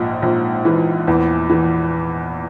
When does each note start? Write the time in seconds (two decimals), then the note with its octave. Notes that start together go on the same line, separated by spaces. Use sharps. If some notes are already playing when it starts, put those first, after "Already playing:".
Already playing: A#1 G#2
0.22 A#1
0.65 E3
1.07 E2
1.50 E3